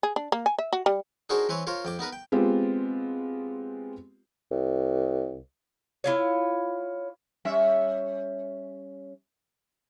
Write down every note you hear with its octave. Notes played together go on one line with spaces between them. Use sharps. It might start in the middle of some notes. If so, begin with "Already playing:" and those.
G#4
D4
A#3
G#5
E5
F#4
G3
D4 D#4 F#4 G#4 A#4 C5
E3 C4 B4 C#5
F4 A#4 C5 C#5
F2 G5 D6
B3 D#4 A#4 B4
G5
G#3 B3 C4 F4 G4
C2
E4 F4 C#5
G3 C#4 E5